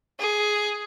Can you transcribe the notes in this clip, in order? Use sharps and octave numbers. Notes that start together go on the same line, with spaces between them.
G#4